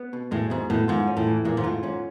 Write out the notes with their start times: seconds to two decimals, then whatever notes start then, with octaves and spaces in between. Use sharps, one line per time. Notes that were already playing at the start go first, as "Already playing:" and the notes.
Already playing: B3
0.13 B2
0.31 A2 G#3
0.50 G#2 B2
0.70 A2 B3
0.88 G#2 F4
1.07 C#4
1.17 A2
1.27 E3
1.45 A#2 G#3
1.57 G#2
1.63 A2 F4
1.83 G#2 C#4